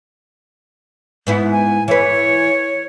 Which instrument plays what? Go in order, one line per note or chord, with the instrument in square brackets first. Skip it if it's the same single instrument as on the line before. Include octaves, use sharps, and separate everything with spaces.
[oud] G#2 B3 E4
[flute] G#5
[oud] E3 B4 [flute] C#5